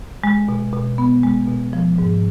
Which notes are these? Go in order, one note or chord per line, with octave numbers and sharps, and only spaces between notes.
G#3
B2
B2
B3
G#3
B2
F3
G#2